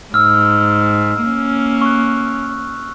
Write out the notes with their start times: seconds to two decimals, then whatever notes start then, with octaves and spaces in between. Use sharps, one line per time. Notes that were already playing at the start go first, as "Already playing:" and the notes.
0.14 G#2 E6 F6
1.21 A#3 C#4
1.81 C#6 F#6